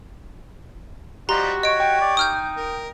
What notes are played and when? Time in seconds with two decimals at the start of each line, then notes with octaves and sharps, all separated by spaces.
1.29 F3 G3 D#4 F#4 G4 A#5 C6
1.63 G4 C#5 D#5 D7
1.80 G5
2.01 D5
2.17 D#4 D#6 F6 G6
2.57 A#4